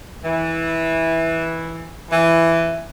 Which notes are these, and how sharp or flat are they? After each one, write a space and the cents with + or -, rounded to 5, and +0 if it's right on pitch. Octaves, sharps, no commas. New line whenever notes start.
E3 -10
E3 +10